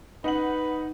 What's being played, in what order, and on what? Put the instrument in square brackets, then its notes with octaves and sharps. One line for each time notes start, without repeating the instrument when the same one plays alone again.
[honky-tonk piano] D#4 F#5 F#7 [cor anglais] B4